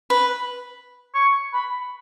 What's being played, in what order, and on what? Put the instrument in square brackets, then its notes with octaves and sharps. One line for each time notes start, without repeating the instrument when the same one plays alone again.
[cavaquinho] B4
[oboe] C#6
B5